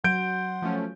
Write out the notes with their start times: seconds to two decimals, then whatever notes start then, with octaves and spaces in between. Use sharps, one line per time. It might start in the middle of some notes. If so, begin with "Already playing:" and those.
0.04 F#3 F#5 C6 G6 D7
0.62 F3 A3 C#4